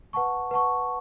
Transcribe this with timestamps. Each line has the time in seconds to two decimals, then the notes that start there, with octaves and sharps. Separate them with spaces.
0.13 B4 F#5 A5 C#6
0.51 B4 F#5 A5 C#6